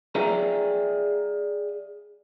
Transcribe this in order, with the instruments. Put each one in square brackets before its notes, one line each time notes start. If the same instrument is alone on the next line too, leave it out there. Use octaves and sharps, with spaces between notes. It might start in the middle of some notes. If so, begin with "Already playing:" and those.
[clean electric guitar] G#4 D5 E5 F5 G5 A#5